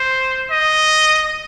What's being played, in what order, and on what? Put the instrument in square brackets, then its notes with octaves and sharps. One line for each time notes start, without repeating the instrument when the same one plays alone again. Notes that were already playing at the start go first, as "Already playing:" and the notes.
Already playing: [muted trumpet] C5
D#5